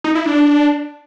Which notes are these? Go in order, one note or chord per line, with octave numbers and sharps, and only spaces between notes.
D#4
E4
D4